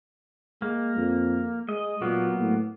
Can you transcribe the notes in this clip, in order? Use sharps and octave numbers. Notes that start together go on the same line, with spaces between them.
G#3 A#3
F2
G#3 D#5
A#2 F#3 A#3 B3
A2